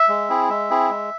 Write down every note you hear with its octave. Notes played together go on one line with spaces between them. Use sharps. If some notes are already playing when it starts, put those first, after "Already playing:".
Already playing: E5
G#3
C4 E4 G#4
G#3 E5
C4 E4 G#4
G#3